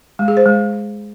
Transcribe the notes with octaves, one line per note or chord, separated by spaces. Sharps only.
G#3
G#4
C5
G#3